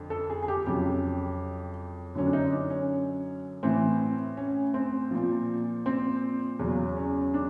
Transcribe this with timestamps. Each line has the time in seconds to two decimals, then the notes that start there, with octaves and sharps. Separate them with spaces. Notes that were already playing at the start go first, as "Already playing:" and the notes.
Already playing: F2 D3
0.10 A4
0.30 G#4
0.43 G#4
0.48 G4
0.66 F2 C#3 F#3 G4
2.15 F#2 D3 F#3 C#4
2.26 D4
2.33 D#4
2.52 D4
2.70 C#4
3.63 A2 E3 C4
4.37 C#4
4.74 C4
5.11 A#2 F3
5.86 C4
6.59 E2 C#3 F#3 C#4
6.97 C#4
7.34 D4